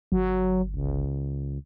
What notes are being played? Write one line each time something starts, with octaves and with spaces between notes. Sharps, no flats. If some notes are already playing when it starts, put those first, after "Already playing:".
G1 F#3
C#2